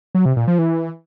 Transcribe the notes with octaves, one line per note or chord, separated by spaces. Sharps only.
F#3
C3
A#2
F3
E3